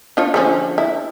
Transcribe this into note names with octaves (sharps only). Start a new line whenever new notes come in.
D4 F4 C#5
D3 F3 C#4
E4